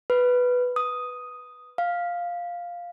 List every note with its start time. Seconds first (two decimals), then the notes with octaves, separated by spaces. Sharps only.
0.10 B4
0.76 D#6
1.78 F5